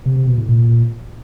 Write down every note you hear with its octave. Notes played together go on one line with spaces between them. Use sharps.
C3
C3
B2
A2
A#2